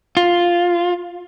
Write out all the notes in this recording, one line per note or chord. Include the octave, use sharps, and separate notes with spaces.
F4